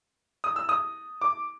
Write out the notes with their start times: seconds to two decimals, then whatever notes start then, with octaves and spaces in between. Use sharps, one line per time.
0.44 D#6
0.56 E6
0.69 D#6
1.21 D6